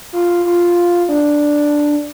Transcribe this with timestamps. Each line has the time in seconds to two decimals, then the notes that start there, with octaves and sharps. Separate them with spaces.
0.13 F4
0.45 F4
1.09 D4